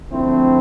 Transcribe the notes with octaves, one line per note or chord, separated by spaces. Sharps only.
D3 F3 A3 C4 E4